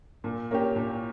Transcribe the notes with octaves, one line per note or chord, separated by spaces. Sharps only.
A#2
A#3 C#4 G4
A#2